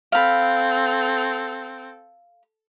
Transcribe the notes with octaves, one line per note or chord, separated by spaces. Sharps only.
C4 A4 F5 B5